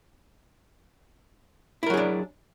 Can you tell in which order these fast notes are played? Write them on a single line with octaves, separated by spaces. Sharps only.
E4 A#4 F#3 G#4 D4